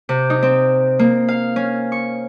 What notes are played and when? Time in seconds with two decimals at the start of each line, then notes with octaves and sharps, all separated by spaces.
0.09 C3
0.30 D#4
0.43 C4
0.99 A#3
1.28 F5
1.56 C#4
1.92 C#6